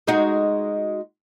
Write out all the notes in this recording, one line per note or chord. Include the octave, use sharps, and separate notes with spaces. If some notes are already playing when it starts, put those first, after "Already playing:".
G#3 D#4 F#4